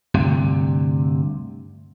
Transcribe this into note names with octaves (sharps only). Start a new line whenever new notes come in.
D2 G2 C3